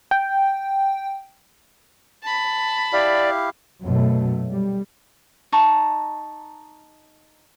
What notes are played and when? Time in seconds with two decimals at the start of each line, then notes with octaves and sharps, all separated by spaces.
0.11 G5
2.23 A5 B5
2.93 E4 G4 D5 F5
3.84 A#1 F#2 B2 F#3 A3
4.51 G3
5.52 D#4 A5 A#5 C#6